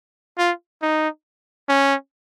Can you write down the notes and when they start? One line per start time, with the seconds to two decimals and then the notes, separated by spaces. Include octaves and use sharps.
0.38 F4
0.82 D#4
1.69 C#4